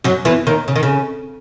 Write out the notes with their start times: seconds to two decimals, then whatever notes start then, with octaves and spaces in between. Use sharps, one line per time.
0.04 F#2 F#3
0.25 E2 E3
0.47 D#2 D#3
0.68 C#3
0.76 D#3
0.83 C#3